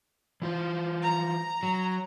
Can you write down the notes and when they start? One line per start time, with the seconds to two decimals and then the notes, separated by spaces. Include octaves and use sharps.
0.42 E3 F4 C5
1.02 A#5
1.63 F#3